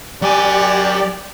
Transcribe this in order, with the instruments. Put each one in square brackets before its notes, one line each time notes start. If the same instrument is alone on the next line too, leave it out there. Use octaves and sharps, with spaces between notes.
[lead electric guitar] F#3 G#5 [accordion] G4 D5